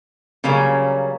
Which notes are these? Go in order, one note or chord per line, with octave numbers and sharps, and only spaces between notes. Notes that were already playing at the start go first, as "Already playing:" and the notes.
C#3 F#3 G3 A#3 C#4